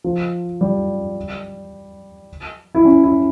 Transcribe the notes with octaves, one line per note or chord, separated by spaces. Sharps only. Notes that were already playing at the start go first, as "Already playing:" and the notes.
F3
G3
E4
C#4
E4